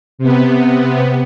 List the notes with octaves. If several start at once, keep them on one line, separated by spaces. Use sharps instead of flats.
C3 B3